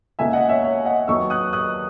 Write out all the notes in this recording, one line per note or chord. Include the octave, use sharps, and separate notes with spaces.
C#2 B2 A#3 D#4 E5 G#5
D#5 F#5
C#5 E5
C#5 E5
D#5 F#5
D#2 D#3 F#3 B3 D#4 C#6 E6
D#6 F#6
D#6 F#6